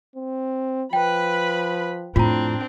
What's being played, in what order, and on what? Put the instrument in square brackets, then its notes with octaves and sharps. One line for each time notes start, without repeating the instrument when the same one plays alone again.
[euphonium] C4
[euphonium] F3 [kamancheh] B4 B5 [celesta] G5
[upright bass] F2 A2 [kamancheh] C4 D4 [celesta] F4 A#5